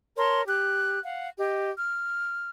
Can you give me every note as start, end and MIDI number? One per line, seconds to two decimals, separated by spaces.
0.18 0.41 70
0.18 0.41 73
0.18 0.41 81
0.18 0.41 84
0.48 0.98 67
0.48 0.98 90
1.04 1.29 77
1.04 1.29 78
1.38 1.71 67
1.38 1.71 75
1.78 2.49 89